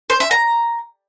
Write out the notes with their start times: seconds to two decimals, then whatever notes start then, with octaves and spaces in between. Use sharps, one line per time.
0.10 C5
0.20 E5
0.31 A#5